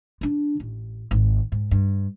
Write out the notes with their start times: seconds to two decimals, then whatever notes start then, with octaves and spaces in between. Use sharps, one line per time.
0.21 D3 D4
0.60 A1
1.11 G#1
1.52 G#2
1.71 G2